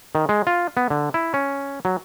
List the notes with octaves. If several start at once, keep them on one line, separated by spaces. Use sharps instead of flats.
D#3
G#3
F4
B3
D3
E4
C#4
F#3